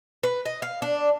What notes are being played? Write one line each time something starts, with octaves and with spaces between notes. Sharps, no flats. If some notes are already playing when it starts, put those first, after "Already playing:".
B4
D#5
F5
D4